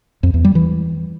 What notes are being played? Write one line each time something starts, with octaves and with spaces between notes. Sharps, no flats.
F2
E2
G3
E3